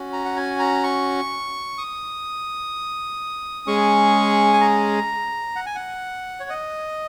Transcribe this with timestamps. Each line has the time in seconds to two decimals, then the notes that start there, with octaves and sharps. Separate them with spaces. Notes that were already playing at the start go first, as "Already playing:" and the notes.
Already playing: C#4 F#4
0.13 A#5
0.25 F#5
0.37 G#5
0.59 A#5
0.84 C#6
1.78 D#6
3.66 G#3 C#4 G#4 C#6
4.53 G#5
4.61 A#5
5.56 F#5
5.66 G#5
5.75 F#5
6.40 C#5
6.50 D#5